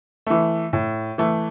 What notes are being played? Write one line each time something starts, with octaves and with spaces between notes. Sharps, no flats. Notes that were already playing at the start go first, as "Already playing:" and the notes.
E3 A3
A2
E3 A3